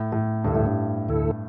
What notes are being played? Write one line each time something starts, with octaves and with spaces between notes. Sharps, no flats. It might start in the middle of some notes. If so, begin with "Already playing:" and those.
Already playing: A2
A2
D2 G2 D3 A3 E4 A4
A2
G2
D2 D3 A3 E4 A4